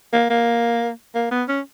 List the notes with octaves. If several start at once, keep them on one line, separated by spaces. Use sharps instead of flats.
A#3
A#3
A#3
B3
C#4